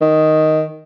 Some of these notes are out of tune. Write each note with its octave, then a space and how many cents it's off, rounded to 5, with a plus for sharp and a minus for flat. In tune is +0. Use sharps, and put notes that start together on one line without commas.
D#3 +0